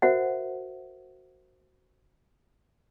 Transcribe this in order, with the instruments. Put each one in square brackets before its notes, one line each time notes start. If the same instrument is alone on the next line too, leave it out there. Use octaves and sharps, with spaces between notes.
[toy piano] F#4 A#4 C5 E5 F#5